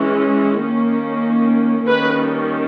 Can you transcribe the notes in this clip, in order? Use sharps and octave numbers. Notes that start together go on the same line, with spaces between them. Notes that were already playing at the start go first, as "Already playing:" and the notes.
Already playing: E3 G#3 C#4
D#3 A#3 C#4
D#3 G3 A#3 C#4 B4